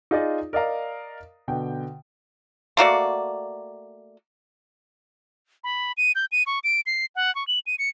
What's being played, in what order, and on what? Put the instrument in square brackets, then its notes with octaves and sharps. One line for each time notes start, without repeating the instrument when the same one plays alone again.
[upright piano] D#4 F4 G#4 D5 D#5
A#4 D5 D#5 F5 A#5
B2 D3 G5
[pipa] A3 A#3 F#4 D5
[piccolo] B5
D#7
G6
D#7
C#6
D7
C7
F#5
C#6
F#7
D#7
C#7